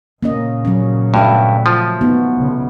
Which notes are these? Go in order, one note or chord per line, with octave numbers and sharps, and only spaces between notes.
A#2 C#3 A#3 C#4 D#5
F#3 C#4
G2 A3 F#4 E5
F3
B3 D#4 F#4
B1 C#3